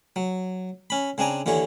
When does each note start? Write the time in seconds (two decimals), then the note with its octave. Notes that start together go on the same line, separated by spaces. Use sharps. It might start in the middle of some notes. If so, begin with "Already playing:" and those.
0.16 F#3
0.90 C#4 B5
1.18 C#3 C4 D4 G#5 A#5
1.46 D#2 D3 E3 C#5